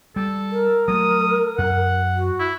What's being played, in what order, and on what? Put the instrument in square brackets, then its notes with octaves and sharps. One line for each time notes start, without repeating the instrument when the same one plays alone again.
[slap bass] G3 [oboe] A4
[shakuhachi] A#4
[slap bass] F#3 A3 [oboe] D#6
[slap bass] F#2 [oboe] F#5
[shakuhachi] F#4
[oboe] E4